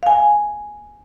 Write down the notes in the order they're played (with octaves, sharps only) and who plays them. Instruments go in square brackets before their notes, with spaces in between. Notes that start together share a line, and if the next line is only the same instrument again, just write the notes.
[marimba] F5 G#5